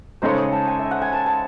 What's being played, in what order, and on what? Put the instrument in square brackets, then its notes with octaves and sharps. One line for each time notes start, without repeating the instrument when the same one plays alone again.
[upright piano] C#3 G#3 D#4 A4 C#5 [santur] C5
[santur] D#5
A5
G#5
E5
F#5
G#5
A5
A5